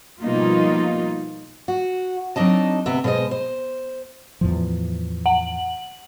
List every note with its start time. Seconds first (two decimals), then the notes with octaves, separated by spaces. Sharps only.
0.22 B2 F3 G3 A#3 D#4 F4
1.68 F#4
2.36 F#3 C4 D4 D#4 D#5 A5
2.86 D2 C3 B3 E5
3.04 B2 G#3 G#4 C5 D#5
3.31 C5
4.41 E2 A2 F3
5.26 F#5 F#7